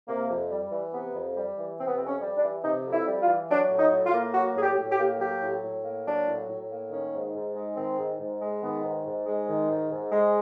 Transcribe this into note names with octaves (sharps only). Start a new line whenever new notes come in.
C3 A#3
F2
G3
E3
C3 B3
F2
G3
E3
C3 C4
B3
C4
F2
C#4
G3
D4
E3
C3 D#4
F2
E4
G3
F4
E3
F#3 D4
A2
D#4
A2
F4
A#3
F#3 F#4
A2 G#4
G4
A2
G4
A#3
F#3 G4
A2
A2
A#3
F#3 D4
A2
A2
A#3
D#3 C#4
G#2
G#2
G#3
D#3 C4
G#2
G#2
G#3
D#3 B3
G#2
G#2
G#3
D#3
G#2
G#2
G#3